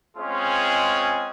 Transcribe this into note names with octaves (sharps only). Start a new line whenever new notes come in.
G#3 C4 C#4 F4 G#4